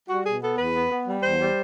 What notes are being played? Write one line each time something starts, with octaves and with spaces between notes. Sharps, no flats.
G3 F#4
B2 G#4
B3 A4
E2 B4
B3
B3
G3
E2 C5
G3